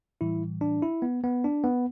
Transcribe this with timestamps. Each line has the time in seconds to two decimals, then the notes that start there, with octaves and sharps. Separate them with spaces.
0.21 A2 E3 G3 E4
0.61 D4
0.82 E4
1.02 B3
1.24 B3
1.44 D4
1.64 B3